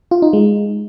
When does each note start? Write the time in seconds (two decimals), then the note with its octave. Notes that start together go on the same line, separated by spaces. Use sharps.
0.11 F4
0.22 D#4
0.33 G#3